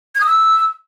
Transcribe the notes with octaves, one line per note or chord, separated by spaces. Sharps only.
G#6
D#6
E6